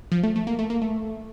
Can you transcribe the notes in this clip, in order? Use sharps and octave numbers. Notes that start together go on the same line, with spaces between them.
F3
A3
A3
A#3
A3
A#3
A3